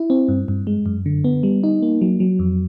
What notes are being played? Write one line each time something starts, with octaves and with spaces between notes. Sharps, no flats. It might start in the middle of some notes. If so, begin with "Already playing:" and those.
Already playing: E4
C4
G2
G2
G#3
F#2
D3
B3
G3
D#4
A#3
F#3
F#3
F2